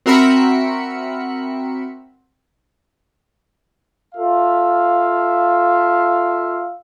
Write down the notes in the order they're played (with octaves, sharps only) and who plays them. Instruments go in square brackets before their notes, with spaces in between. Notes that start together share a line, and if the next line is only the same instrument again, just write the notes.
[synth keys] C4 F#4 A#4 E5 B5 C#7
[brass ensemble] F4 A4 E5 F5